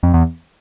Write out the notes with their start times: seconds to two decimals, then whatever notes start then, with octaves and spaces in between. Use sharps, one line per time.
0.03 F2
0.14 E2